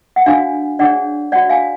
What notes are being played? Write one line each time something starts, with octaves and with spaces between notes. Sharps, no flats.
F#5
D4 F#4 C#5 F5 G#5
D4 G#4 C#5 D5 F#5
F#4 C#5 D5 F#5
F5 G#5